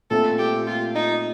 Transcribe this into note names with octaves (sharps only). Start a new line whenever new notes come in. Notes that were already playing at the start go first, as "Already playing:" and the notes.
A#2 A3 C4 A4
G4
F4
D#4